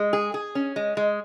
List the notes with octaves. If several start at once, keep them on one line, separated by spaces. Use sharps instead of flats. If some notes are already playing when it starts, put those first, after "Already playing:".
Already playing: G#3
G#4
G#4
C#4
G#3
G#3